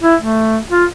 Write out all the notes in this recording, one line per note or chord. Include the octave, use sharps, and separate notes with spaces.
E4
A3
F4